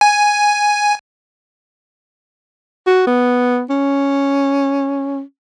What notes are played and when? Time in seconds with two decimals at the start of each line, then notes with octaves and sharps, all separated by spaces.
0.01 G#5
2.87 F#4
3.07 B3
3.70 C#4